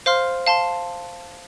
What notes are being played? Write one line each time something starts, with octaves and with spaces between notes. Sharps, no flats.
C5 F5 C6 F6
F5 A5 C6